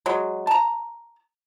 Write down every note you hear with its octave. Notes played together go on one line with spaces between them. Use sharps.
F#3 G#3
A5 A#5